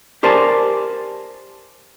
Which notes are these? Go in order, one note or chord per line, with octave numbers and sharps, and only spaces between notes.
G4 A#4 C5 D5 G#5 A5